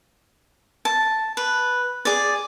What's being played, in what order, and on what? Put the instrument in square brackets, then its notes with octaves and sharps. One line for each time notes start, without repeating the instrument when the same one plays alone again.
[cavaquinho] A5
B4
G#4 D5